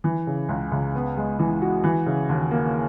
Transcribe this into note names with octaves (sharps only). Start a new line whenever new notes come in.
E3
C#3
C#2
C#2
B3
G#3
E3
F#4
E3
C#3
D#2
A#3